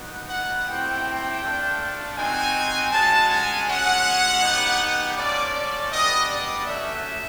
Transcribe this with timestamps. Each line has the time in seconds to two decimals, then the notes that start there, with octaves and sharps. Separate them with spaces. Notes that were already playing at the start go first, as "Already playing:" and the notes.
Already playing: B3 D#4 F#4
0.29 F#5
0.66 A3 C4 E4 G4 G5
1.41 A3 D4 F4
2.16 C4 D#4 F#4 G#5
2.91 G#3 C#4 F#4 A5
3.28 G#5
3.66 G#3 C#4 F#4 F#5
4.41 B3 D#4 G4
5.17 A3 C#4 F4 D5
5.54 D5
5.91 G3 B3 D4 D#5
6.29 D5
6.67 A3 C#4 F#4 E5